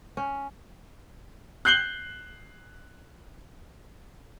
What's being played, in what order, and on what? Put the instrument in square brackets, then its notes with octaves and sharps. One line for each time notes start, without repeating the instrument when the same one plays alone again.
[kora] C#4
[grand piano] F#6 G6 C7 F#7 G7